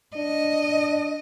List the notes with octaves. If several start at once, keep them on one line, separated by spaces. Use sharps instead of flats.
D4 D#5